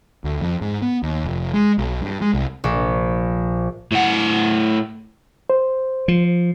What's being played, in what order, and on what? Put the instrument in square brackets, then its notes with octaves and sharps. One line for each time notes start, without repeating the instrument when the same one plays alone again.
[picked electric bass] D2
F2
G#2
B3
D#2
F1
G#3
B1
G2
G#3
C2
[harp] A#1
[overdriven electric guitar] A2 F#5
[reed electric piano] C5
[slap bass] F3